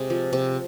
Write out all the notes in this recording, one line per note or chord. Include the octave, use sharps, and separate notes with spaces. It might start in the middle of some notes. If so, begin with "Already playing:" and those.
Already playing: C3 G#3
F3
C3